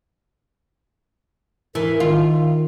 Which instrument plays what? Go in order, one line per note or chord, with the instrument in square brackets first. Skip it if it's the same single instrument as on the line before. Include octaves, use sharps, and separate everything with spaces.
[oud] E3 [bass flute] A#4
[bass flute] D#3 [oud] F4